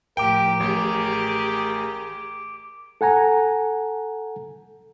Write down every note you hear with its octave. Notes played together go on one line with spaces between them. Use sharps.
A2 F3 G4 A#4 G5 D6 D7
A1 G4 G#4 A#4
A4 F#5 G#5 A#5